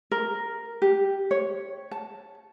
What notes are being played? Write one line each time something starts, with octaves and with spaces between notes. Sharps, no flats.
A#4
G4
C#5
A5